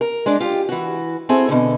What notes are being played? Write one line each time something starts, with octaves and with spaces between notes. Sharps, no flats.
A#4
G#3 D4 D5
F4 G4
E3 F#4
C4 E4 F#4 G#4 A4
B2 D3